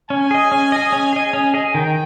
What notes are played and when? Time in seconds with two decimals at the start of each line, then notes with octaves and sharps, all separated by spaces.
0.10 C#4 G#5
0.31 G#4 D#5
0.52 C#4
0.72 G#4 D#5
0.92 C#4
1.13 G#4 D#5
1.33 C#4
1.54 G#4 D#5
1.74 D#3 G5